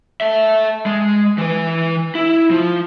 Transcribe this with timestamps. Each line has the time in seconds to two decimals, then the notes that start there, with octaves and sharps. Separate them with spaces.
0.21 A4 E5
0.86 G#3
1.38 E3 B4
2.15 E4
2.51 F3